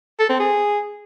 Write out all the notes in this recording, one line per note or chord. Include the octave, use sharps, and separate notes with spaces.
A4
C4
G#4